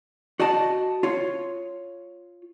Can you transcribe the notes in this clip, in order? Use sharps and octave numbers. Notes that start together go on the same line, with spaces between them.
F#4 D5 D#5 A5
F4 C#5